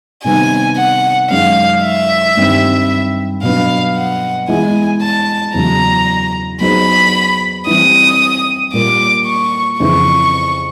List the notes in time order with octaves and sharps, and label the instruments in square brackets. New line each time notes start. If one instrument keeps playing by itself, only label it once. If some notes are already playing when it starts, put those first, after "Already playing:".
[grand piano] C3 D#3 G3 B3 D#4 [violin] G#5
[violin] F#5
[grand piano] F#2 D#3 G#3 C#4 [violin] F5
[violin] E5
[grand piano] G2 D#3 G3 C4
[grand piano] B2 F#3 B3 D4 [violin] F5
[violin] F#5
[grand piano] E3 G#3 B3 E4 [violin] G#5
[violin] A5
[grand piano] E2 C#3 F#3 [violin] A#5
[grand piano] F#3 B3 D#4 G#4 C5 [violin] B5
[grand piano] E3 G3 C4 [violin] D#6
[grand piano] A#2 G3 A#3 [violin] D6
[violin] C#6
[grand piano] F2 C#3 E3 [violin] C#6